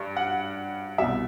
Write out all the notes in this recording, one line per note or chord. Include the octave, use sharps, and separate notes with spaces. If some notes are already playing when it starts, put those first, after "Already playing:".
Already playing: G2
F#5
C2 B2 G3 E5